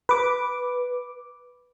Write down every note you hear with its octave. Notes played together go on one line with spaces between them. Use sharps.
B4 D6